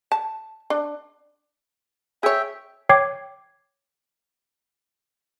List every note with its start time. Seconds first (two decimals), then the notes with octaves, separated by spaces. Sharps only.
0.12 A5
0.70 D4
2.23 G#4 C#5 E5 G5
2.89 C#5 G5 D6 G#6 C7